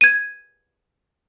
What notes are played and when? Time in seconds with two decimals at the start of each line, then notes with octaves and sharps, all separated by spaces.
0.01 G#6 D#7